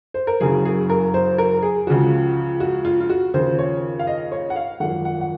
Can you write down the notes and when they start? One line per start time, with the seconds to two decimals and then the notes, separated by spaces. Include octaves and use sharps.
0.14 C5
0.27 A#4
0.40 F#1 F#2 C#3 F#3 G#4
0.65 G#4
0.90 A#4
1.14 C5
1.38 A#4
1.62 G#4
1.87 C#2 C#3 F3 F#4
2.60 F#4
2.85 F4
3.00 F4
3.09 F#4
3.34 D#2 C#3 F3 C5
3.59 C#5
3.99 F5
4.07 D#5
4.32 C#5
4.50 F#5
4.56 F5
4.80 G#1 F#2 F3 F#5
5.05 F#5
5.21 F#5